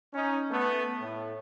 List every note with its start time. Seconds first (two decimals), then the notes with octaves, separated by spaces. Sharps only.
0.13 C#4 D#4
0.50 A3 B3
1.00 A2